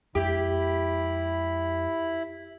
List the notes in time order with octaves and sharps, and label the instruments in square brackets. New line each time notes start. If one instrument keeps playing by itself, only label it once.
[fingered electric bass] F2 G#3 [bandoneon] E4 B5 [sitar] G4